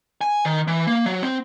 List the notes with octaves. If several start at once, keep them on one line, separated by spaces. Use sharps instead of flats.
G#5
D#3
E3
A#3
F#3
C4